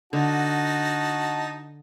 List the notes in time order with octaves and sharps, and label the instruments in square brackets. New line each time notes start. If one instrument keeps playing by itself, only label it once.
[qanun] D3 [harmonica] D#4 F#4 A5